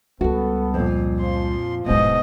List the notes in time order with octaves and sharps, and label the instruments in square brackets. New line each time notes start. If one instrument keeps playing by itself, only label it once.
[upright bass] C#2 G3 [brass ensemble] B3 A4 [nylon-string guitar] F#4
[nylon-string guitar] F2 A#2
[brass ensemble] F3 [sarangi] C6
[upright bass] D1 E4 [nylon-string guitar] G#2 B2 [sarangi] D#5